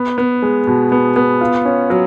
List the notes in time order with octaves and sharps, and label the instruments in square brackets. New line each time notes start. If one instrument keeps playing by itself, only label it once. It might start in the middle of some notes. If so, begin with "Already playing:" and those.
Already playing: [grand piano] B3
B3
G#3
B2
B3
B3
F4
C#4
F#3